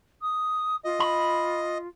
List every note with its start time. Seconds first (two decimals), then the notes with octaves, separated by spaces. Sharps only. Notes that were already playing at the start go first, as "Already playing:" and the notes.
0.21 D#6
0.84 F4 D#5
1.00 B5